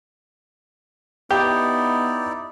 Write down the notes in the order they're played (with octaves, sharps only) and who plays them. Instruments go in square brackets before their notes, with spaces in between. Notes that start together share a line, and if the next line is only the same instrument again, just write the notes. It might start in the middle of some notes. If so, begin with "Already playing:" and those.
[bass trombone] B3 [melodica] D#4 E4 D5 [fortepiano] G4